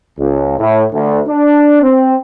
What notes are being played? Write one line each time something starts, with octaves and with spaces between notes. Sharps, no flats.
C#2
A2
D2
D4
C4